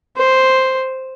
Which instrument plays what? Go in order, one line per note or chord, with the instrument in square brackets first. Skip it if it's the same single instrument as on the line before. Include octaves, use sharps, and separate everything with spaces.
[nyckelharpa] C5